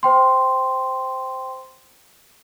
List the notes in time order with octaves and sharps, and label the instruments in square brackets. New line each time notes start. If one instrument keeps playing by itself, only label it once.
[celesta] C5 G5 C6